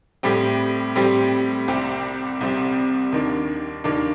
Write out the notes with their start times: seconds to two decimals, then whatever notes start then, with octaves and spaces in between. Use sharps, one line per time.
0.23 A2 G3 C4 G4
0.95 A2 G3 C4 G4
1.68 C2 C3 G3 C4 G4
2.41 C2 C3 G3 C4 G4
3.13 D#2 D#3 A#3 D4
3.84 D#2 D#3 A#3 D4